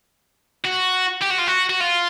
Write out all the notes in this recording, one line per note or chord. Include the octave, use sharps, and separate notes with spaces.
F#4
G4
F#4
F4
F#4
F#4
F4